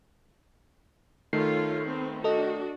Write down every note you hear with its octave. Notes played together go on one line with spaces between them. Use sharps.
D#3 A3 F4 A4 C#5 C7
B3 C4
D4 F#4 A4 D#5